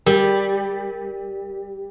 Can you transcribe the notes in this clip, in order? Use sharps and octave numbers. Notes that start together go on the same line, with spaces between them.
G3 A#4